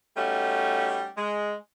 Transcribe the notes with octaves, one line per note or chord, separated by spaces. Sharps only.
G3 A3 C#4 D#4 F#4
G#3